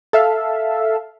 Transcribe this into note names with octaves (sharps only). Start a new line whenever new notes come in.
A4 E5 F5